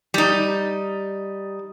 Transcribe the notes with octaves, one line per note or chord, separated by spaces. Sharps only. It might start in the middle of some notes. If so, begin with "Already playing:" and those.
G3 D#4